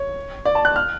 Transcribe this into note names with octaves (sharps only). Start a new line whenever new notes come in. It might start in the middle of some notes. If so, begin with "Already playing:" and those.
Already playing: C#5
D5
A5
F#6
F6